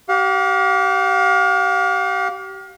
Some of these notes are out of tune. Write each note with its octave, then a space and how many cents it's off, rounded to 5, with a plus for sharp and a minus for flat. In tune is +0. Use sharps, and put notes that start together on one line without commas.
G4 -30 F5 +35